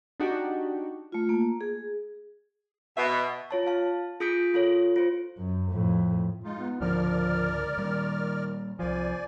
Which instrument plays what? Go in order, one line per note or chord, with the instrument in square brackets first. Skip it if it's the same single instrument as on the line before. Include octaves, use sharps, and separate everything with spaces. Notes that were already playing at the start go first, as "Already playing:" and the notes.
[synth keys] D4 D#4 F#4 G4
[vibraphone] A3 F4
A#3
G#4
[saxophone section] B2 [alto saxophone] E5
[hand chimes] F4 C#5 A5
F5 A5
F4 G#4 D#6 G6 B6 D7
F4 A4 C#5
F4 C5
[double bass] F#2
F2 A2
[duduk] G#3 [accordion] D#4 F4
[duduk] B3
[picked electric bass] C#2 G#2 D3 [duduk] F3 [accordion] A#4 D5 F6
[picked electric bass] A#2 G3 [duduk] D#3
[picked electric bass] C2 F3 [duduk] C5 [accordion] D5 G#5